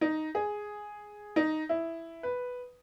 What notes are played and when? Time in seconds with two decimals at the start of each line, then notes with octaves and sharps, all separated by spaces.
0.01 D#4
0.35 G#4
1.36 D#4
1.69 E4
2.23 B4